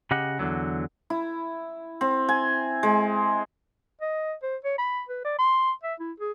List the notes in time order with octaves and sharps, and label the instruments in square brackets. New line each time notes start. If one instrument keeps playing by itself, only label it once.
[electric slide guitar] C#3 G4 D#5 F#5
E2 D3 F#3
[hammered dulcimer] E4
C4
G#5
G#3
[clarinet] D#5
C5
C#5
B5
B4
D5
C6
E5
E4
G#4